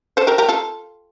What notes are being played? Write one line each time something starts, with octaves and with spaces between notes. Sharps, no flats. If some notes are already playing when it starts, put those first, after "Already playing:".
A4 C5
G4 A#4
G4 A#4
F4 A4